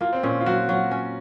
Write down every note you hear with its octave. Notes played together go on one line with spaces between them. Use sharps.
A#3 F4
C4
A#2 C#4
F4
F#3 F#4
F#3 F4
C#4